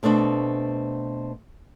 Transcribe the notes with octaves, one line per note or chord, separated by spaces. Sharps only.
B2 A3 B3 C4 D4